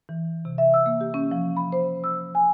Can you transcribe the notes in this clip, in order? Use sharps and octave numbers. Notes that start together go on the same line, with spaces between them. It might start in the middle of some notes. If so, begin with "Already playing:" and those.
E3
C3
E5
E6
A#3
G4
C#4
F3
B5
C5
E6
G#5